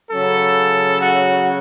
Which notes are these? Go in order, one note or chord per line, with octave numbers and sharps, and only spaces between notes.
C#3 F#3 C#4 A4
F#4